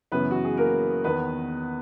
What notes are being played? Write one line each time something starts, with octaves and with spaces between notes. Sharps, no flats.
F#2 C#3 E3 B3 B4
F#4
G#4
A#3 A#4
E2 D#3 B3 B4